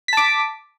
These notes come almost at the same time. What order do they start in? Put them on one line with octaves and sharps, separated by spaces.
B6 A5 D6